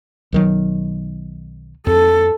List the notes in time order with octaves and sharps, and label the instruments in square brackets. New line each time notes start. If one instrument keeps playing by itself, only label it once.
[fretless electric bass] B1 D#3 F#3
[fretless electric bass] F2 [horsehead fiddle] A4